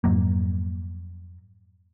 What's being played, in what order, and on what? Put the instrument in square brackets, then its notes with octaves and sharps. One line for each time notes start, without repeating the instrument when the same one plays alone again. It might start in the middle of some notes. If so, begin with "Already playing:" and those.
[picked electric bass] F2 G#2 F#3 A#3